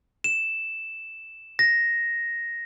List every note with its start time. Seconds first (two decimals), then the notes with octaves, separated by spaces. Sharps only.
0.24 E7
1.59 A#6